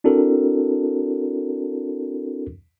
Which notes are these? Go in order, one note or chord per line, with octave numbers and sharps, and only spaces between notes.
C4 D4 E4 F#4 A4 A#4